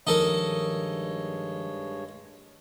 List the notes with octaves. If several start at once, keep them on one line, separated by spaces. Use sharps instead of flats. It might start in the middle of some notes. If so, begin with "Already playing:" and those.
G2 D#3 F3 G#3 D#4 A4 A#4 C#5